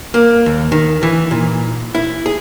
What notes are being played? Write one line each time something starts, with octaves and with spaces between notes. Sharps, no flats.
A#3
D#2
D#3
E3
A#2
E4
G#4